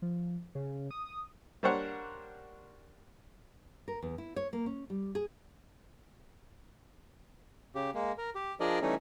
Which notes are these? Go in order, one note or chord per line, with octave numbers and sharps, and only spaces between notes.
F3
C#3
D#6
G3 A#3 D4 C5 C#5 F#5
A#4
E2
E4
C#5
A#3
C#4
G3
G#4
C#3 G4
G#3 A#3
A#4
G4
F3 D4 G#4 A#4 D5 D#5
E3 G3 A3 C#4 D#4